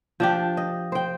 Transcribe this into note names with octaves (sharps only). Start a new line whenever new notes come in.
F3 D4 G4
D#5
C5 G5